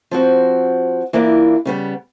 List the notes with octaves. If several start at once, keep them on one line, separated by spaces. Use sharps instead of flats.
F3 C4 F#4
E3 A#3 B3 D4 E4 F4
C#3 G3 B3